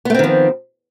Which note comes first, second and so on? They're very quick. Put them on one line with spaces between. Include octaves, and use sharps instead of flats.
B3 A3 C4 D#3 F3